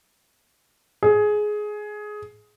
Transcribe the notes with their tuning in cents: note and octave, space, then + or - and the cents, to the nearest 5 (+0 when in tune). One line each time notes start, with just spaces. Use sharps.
G#4 +15